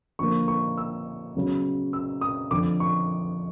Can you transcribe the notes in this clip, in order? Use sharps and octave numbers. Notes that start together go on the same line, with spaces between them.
D3 F3 A#3 C#6
C#6
E6
C#3 F#3 B3
E6
D#6
F2 D3 F3 D6
C#6